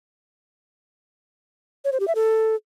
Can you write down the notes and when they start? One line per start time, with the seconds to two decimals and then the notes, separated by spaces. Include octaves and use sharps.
1.85 C#5
1.92 C5
2.00 G4
2.08 E5
2.15 A4